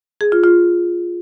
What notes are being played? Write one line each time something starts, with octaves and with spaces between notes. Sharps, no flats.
G#4
F4
F4